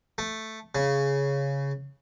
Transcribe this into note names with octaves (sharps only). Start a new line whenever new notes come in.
A3
C#3